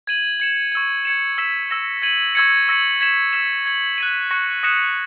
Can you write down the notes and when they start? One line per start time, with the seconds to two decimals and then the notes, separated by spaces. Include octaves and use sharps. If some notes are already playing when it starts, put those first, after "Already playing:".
0.07 G#6 D#7 F#7
0.40 G#6 C#7 E7
0.72 C#6 E6 G#6
1.05 G#6 C#7 E7
1.38 E6 B6 E7
1.70 E6 A#6 E7
2.02 G#6 D#7 F#7
2.35 C#6 E6 G#6 C#7
2.68 C#6 E6 A#6 C#7 F#7
3.01 G#6 B6 E7
3.33 E6 B6 E7
3.66 G#6 C#7 F#7
3.98 F#6 B6 D#7
4.31 C#6 F#6 A#6 C#7
4.63 D#6 F#6 A#6 C#7 E7